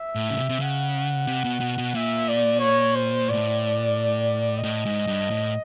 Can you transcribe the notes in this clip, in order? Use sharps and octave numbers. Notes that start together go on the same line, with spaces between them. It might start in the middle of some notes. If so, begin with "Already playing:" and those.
Already playing: E5
A2
C#3
C3
C3
C#3 F#5
C3
B2
B2
B2
A#2 E5
D5
C#5
C5
A2 D5
A2 D#5
G#2
G2
A2